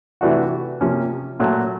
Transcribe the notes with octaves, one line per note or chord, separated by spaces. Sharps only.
C3 E3 A3 D4 F#4
C3 F3 A#3 C#4
A#2 F#3 A3